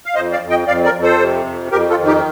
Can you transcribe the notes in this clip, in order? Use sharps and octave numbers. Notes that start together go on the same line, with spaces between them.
F5
F2 C5 D#5
D5 F5
F2
D#5 G5
F2 D5 F5
A#4 D5
F2
A4 C5
C3
F2
F2 G4 A#4
F4 A4
D#3
D#4 G4